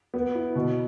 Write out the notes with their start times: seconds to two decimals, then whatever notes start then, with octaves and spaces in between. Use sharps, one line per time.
0.14 B3
0.35 E4
0.55 B2